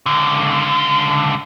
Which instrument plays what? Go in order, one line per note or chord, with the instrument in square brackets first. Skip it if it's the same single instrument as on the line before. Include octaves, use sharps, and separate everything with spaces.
[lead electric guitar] C#2 D3